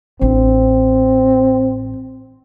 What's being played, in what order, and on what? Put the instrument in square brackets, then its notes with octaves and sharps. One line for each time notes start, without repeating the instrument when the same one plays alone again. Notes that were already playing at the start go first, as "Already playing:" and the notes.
[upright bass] A1 D4 [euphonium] C4